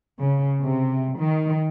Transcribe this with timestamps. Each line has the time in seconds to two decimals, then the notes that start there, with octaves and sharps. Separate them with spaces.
0.20 C#3
0.61 C3
1.17 D#3